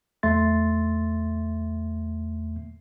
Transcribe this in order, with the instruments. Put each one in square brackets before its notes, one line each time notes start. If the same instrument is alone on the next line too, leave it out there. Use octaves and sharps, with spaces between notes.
[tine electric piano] E2 A3 E5 C6 A6